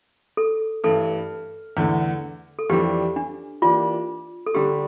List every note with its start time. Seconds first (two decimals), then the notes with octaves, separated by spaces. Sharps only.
0.37 A4
0.84 G2 E3 A3 A4
1.77 E2 D3 A3
2.59 A4
2.70 F2 E3 G3 D4 G4
3.16 D4
3.62 E3 A#3 D4 F4 G4
4.46 A4
4.54 D3 G3 D4 G4